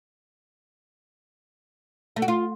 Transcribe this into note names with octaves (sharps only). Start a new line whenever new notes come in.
A3
F#4
F4